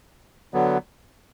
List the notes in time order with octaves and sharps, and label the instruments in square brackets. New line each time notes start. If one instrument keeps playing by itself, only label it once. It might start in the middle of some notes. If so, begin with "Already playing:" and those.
[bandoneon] D3 F#3 B3